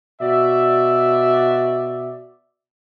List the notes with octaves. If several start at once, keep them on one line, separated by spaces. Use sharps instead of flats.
B2 F#4 D5 E5